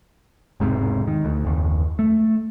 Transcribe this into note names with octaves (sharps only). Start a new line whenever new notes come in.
E1 G#2 C3
D#3
D2
F#1 D#2
A3